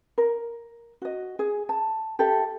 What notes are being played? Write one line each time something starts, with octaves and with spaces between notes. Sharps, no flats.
A#4
F#4 D#5
G#4
A5
G4 A4 E5